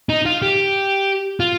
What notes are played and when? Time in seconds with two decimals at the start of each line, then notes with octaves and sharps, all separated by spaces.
0.09 D#4
0.26 F4
0.42 G4
1.40 F4